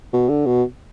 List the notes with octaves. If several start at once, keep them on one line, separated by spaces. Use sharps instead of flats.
B2
D3
B2